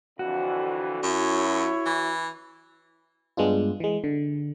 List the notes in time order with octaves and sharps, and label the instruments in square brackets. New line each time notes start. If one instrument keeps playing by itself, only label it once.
[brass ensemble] F2 D3 E3 [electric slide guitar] F#4
[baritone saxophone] F#2 [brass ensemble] E4 C#5
[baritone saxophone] E3
[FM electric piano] G2 G#3 B3 D4 F4
E3 G#3
D3